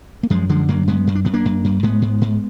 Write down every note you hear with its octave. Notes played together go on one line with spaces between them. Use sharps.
A#3
F#2 F3 G#3
D3 F3 G#3
F#2 F#3 A#3
F#2 G#3 B3
F#2
D4
F#2 B3
A#3 D4
F#2
F#2
G#2 G#3 B3
G#2
G#2